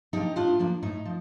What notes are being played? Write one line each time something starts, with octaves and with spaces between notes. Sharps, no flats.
F3 A#3 D4 D#4 G4
A2 D4 F4
F3 A#3 D4
A2 D#4
F3